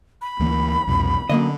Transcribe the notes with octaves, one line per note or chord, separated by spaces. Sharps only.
B5
D2 E3 A#3
C2 F2 B2
F#2 D3 A#3 D#5